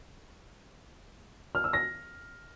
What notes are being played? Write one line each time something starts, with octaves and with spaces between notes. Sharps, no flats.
F6
E6
A#6